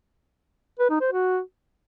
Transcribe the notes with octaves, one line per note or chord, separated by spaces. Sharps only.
B4
D#4
C5
F#4